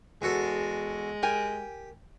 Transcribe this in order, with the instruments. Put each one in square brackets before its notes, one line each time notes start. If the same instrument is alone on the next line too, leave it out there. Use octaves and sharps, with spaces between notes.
[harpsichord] E2 F#4 A4 [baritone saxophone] G#3
[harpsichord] G4 [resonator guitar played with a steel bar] A#4 G5 G#5